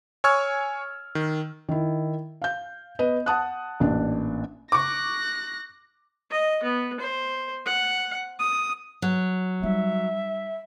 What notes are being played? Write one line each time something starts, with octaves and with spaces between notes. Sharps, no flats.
C#5 G#5 C#6 E6 F6 G#6
D#3
D#3 E4
F5 G6
B3 B4 D#5
F#5 A5 D#6 F#6
A1 A#2 D4
C#6 D6 F#6 A#6
D#5
B3
C5
F#5
D#6
F#3
G3 D#4 E5